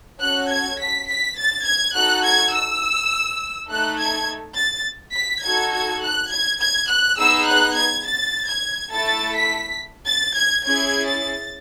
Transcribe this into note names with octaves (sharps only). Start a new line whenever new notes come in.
C#4 F#4 A4 F#6
G#6
B6
B6
A6
G#6
D#4 F#4 A4 F#6
G#6
E6
A3 D#4 A4 F#6
G#6
A6
B6
D#4 F#4 A4 G#6
G#6
F#6
G#6
G#6
F#6
B3 D#4 G#4 E6
F#6
G#6
A6
G#6
A3 E4 A4 A6
B6
A6
G#6
C#4 E4 G#4 G#6
A6